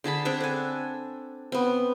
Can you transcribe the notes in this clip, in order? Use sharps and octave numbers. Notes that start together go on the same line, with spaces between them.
D3 G#4 A5 B5
C4 D4 G#4 F#5
A4 G#5
B3 C4